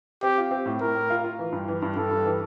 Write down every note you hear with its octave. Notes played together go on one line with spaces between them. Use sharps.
C4 G4
F4
C4
A2
A2 A#4
A2
F4
F4
E3
G2
E3
G2
G2 A4
G2
E3